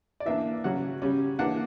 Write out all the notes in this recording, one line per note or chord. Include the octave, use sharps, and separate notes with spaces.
D5
E3 A#3 D4 E5
C#3 F#3 C#4 F#5
C#3 G3 C#4
E3 A#3 D4 F#5